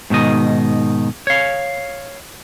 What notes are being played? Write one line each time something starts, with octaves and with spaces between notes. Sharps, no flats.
G#2 B2 D#3 D#5
C#5 F5